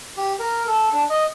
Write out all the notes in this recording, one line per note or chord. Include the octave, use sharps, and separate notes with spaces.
G4
A#4
A4
D4
D#5